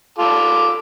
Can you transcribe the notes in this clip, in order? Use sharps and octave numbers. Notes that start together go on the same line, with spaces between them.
F4 A4 D6